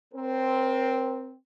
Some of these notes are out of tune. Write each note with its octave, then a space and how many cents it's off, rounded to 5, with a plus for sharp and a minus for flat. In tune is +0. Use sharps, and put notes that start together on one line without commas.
C4 +0 A#4 +30 C#5 +0